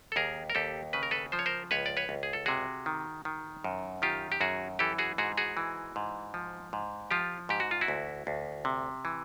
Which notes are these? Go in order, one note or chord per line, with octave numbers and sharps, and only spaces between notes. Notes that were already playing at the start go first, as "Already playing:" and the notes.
A4
D#2 G#4 A#4
A#4
D#2 G4 A4
C#3 B4
A#4
A4 B4
F3 C5
C#5
A#4 C5
C#2 B4 C#5
D5
B4 C#5
C#2
G#4
A4
C3 F#4 G#4
D#3
D#3
F#2
D#3 F4 G4
G4
F#2 F#4 G#4
E3 G4 A4
F#4 G#4
G#2 F#4 G#4
F#4 G#4
E3
G#2
F3
G#2
F3 F4 G4
G#2 G4
F#4
F4
E4 F#4
D2
D2
C3
E3